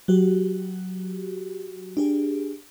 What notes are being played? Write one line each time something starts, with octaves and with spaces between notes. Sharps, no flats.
F#3 F#4 G4
D4 G4 G#4